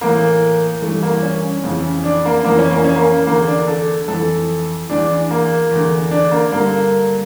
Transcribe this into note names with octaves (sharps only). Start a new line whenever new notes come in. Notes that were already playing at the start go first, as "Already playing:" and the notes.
A2 E3 A#3
G2 E3 A3
A#3
C#4
F2 C#3 E3
D4
A#3
F2 E3 A#3
C#4
A#3
C#4
A#3
E2 D3 A#3
D4
A4
F2 E3 A4
E2 E3 D4
A#3
E2 D3
D4
A#3
G2 D3 A#3